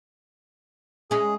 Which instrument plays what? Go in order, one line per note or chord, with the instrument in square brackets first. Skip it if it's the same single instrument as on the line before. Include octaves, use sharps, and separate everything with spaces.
[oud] G#3 C#4 [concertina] G#4